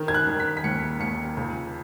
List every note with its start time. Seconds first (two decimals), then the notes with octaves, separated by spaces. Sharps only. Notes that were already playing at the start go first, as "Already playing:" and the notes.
Already playing: D#3
0.08 G#6
0.14 F#6
0.27 D#3
0.40 B6
0.57 B6
0.64 D#2 C#7
1.00 D#2 C#7
1.37 C#2